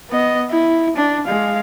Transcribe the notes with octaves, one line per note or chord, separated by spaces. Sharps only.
B3 D#5
E4
D4
G#3 F5